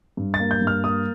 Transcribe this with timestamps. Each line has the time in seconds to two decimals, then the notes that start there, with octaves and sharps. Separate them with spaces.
0.17 G2
0.34 A6
0.40 A#3
0.51 G6
0.61 G2
0.67 F6
0.84 A#3 D#6